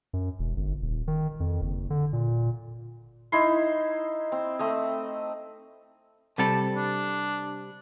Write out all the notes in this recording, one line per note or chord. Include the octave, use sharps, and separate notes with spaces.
F#2
E1
G1
D#1
D#3
F2
F#1
D3
A#2
D#4 E4 C6
C4
A3 C4 D#5
C3 G3 A4 A5
D4